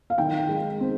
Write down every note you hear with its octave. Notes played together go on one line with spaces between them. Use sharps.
F5
D#3 G5
G#3
C4